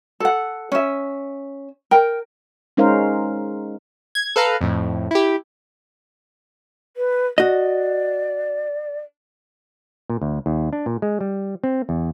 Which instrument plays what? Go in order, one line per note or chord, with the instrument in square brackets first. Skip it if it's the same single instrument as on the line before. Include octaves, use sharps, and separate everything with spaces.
[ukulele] A4 F#5
C#4 E5
A#4 G5
[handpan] G#3 C#4 D#4 A#4 C5 F5
[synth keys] G#6
A4 B4 F5 A#5
F2 A2
E4 G4
[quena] B4
[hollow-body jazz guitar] F#4 D#5 [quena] D5
[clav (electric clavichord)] A#2
D2
D#2
D4
A#2
G#3
G3
C4
E2